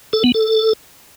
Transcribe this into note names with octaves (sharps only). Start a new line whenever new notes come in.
A4
B3
A4